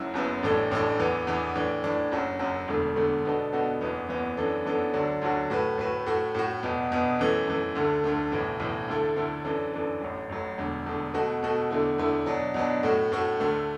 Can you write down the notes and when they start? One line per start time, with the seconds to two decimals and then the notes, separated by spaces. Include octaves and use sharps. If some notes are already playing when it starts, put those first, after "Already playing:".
Already playing: F#1 F#2 F#3 E4
0.14 F#1 F#2 F#3 B3 E4
0.43 A1 A2 E3 D4 A4
0.71 A1 A2 E3 D4 A4
0.99 E2 E3 B3
1.27 E2 E3 B3
1.55 A2 E3 D4
1.84 A2 E3 D4
2.12 F#1 F#2 F#3
2.39 F#1 F#2 F#3
2.68 E1 E2 D3 A3
2.96 E1 E2 D3 A3
3.25 B2 B3 D4 F#4 A4
3.53 B2 B3 D4 F#4 A4
3.81 F#1 E2 E3 B3
4.09 F#1 E2 E3 B3
4.37 F#2 E3 B3 D4 A4
4.65 F#2 E3 B3 D4 A4
4.94 D2 D3 F#3 D4 F#4
5.22 D2 D3 F#3 D4 F#4
5.50 A2 A3 F#4 B4
5.78 A2 A3 F#4 B4
6.06 A2 A3 F#4
6.35 A2 A3 F#4
6.63 E2 B2 B3
6.91 E2 B2 B3
7.19 F#2 E3 A3
7.47 F#2 E3 A3
7.75 D2 D3 A3
8.04 D2 D3 A3
8.32 B1 A2 E3
8.60 B1 A2 E3
8.88 D2 D3 A3 E4 A4
9.16 D2 D3 A3 E4 A4
9.45 F#2 E3 D4 A4
9.73 F#2 E3 D4 A4
10.01 A1 A2 F#3
10.29 A1 A2 F#3
10.58 E1 E2 D3 A3
10.85 E1 E2 D3 A3
11.14 B2 A3 F#4 A4
11.43 B2 A3 F#4 A4
11.71 E2 D3 A3 E4
11.98 E2 D3 A3 E4
12.26 B2 F#3 D4
12.54 B2 F#3 D4
12.83 A2 A3 F#4
13.12 A2 A3 F#4
13.40 D2 D3 A3